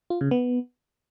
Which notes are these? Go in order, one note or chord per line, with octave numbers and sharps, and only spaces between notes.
F4
C#3
B3